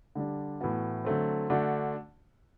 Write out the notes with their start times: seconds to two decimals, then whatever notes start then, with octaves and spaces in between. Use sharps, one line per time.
0.15 D3 G3 D4
0.61 A2 E3 B3 F#4
1.05 D3 F#3 A3 C4
1.50 D3 A3 D4 F#4